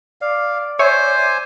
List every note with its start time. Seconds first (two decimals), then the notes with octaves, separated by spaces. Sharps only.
0.21 D5 F5
0.79 C5 C#5 E5 G#5